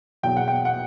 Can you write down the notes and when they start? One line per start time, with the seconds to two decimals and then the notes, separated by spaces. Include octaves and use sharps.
0.23 E2 B2 F#3 G5
0.37 F#5
0.48 G5
0.65 F#5